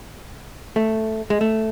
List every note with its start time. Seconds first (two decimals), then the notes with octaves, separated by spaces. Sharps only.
0.76 A3
1.30 G#3
1.41 A3